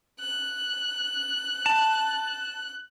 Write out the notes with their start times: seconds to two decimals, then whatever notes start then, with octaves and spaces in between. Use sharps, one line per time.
0.20 F#6
1.66 A5